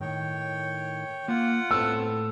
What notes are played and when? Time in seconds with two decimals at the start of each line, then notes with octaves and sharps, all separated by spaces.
0.01 A2 D#3 C#5 G5
1.28 A#3 F4 F#5
1.71 A2 B3 C4 A4 A5 E6